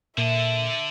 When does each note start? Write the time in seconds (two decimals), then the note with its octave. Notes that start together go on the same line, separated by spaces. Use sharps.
0.18 A#2 D3 A4 E5